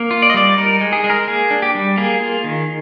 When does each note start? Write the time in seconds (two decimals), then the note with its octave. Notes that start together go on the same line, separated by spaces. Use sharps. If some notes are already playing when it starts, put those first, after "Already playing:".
Already playing: A#3
0.11 F4
0.22 D5
0.30 D#5
0.34 G3 D5
0.58 D#4 A#4
0.81 G#3
0.93 G#4
1.04 G#3
1.10 A#4
1.27 A#3 G#4
1.51 D4
1.62 G4
1.75 G3
1.97 A#3 G#4
2.21 F4
2.44 D#3